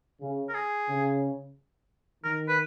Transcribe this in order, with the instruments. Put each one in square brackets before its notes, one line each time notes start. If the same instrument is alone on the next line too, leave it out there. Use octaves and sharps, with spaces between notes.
[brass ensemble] C#3
[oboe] A#4
G#4
[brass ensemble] C#3
[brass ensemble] D#3 [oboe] A#4
[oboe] B4